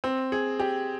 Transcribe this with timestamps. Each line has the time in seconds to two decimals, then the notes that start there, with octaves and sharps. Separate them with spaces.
0.04 C4
0.32 G#4
0.59 G4